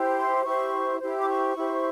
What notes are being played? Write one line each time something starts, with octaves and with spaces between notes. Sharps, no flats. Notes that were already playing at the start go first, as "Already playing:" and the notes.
Already playing: E4 G4 C5
C6
E4 G4 C5 C#6
E4 G4 C5
D6
C#6
E4 G4 C5